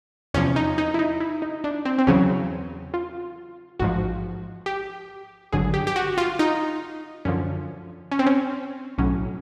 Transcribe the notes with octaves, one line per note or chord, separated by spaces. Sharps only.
E2 C3 F3 C#4
D#4
D#4
E4
D#4
E4
D#4
D4
C4
C4
E2 C#3 F#3 C#4
F4
A1 G#2 F3 F#4
G4
G#1 G2 D3 F#3 G#4
G4
G4
F#4
F4
D#4
F#2 D3 F3 C#4
C#4
C4
C#4
B1 A2 F#3 C#4